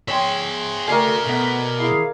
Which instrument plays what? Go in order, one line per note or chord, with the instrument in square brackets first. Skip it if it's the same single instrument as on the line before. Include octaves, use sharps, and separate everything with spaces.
[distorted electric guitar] G#4 E5 [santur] C#5 G5 C6
[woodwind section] A3 F#4 [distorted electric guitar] G#4 F5 [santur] A#4 D5 G#5
[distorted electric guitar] B2 [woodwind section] A3 B3 B4
[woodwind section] E4 G#4 F5